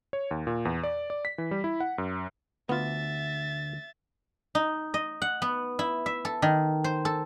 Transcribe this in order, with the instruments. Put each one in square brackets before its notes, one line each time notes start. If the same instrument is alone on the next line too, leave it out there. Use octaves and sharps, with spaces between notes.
[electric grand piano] C#5
D#2
A#2
E2
D5
D5
B6
E3
G3
E4
F#5
F#2
[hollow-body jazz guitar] D2 [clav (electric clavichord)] B3 F4 [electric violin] E5 A6
[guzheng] D#4
D#5
F#5
B3
E4
E5
A4
D#3
C5
A4